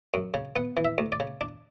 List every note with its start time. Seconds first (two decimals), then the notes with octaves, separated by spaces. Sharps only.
0.14 F#2
0.34 C#3
0.56 B3 F#5
0.77 E3
0.85 E5
0.98 D2
1.12 D5
1.20 C#3
1.41 D4